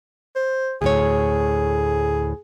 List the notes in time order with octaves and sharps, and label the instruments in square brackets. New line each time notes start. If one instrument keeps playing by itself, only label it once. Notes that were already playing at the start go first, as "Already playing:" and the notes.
[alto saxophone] C5
[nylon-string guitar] D2 A2 C#5 [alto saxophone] G#4